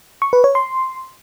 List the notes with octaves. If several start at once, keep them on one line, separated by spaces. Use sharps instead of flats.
C#6
B4
C#5
C6